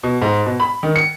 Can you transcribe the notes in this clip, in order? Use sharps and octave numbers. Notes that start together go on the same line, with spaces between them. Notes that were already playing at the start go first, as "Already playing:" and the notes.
B2
G#2
B2
B5
D#3
C#7